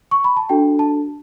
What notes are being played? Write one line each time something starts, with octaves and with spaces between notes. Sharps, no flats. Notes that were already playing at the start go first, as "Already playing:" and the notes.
C#6
B5
A5
D4 F#4 A4 G5
A5